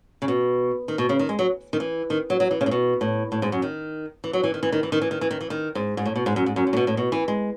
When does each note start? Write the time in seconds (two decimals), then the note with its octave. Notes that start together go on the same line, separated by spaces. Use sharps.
0.22 C#3
0.28 B2
0.88 D#3
0.98 B2
1.09 C#3
1.19 D#3
1.29 G#3
1.39 F#3
1.73 D#3
1.80 E3
2.10 D#3
2.30 F#3
2.40 F#3
2.51 E3
2.61 C#3
2.66 A2
2.71 B2
3.01 A2
3.32 A2
3.42 G#2
3.52 F#2
3.62 D#3
4.24 E3
4.33 F#3
4.44 E3
4.54 D#3
4.63 E3
4.72 D#3
4.83 E3
4.92 D#3
5.02 E3
5.11 D#3
5.21 E3
5.31 D#3
5.41 E3
5.50 D#3
5.75 G#2
5.97 G#2
6.06 A2
6.16 B2
6.26 G#2
6.36 F#2
6.46 G#2
6.56 F#2
6.67 F#2
6.73 A2
6.77 B2
6.87 A2
6.97 B2
7.12 E3
7.28 G#3